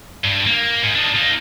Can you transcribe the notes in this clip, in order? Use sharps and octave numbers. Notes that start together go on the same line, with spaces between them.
G2
A#3
G#2
D4 D#4
A#3 D#4